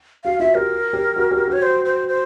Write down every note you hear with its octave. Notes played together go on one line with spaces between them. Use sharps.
F#4 F5
F4 E5
G4 A#4
G4
F#4
G4
F#4 C#5
C5
C5
C5